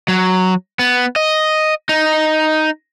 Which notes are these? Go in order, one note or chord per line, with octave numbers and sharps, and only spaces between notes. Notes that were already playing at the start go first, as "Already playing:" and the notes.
F#3
B3
D#5
D#4